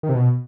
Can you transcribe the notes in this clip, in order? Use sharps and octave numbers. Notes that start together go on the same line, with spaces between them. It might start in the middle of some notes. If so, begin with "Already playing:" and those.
D#3
C3
B2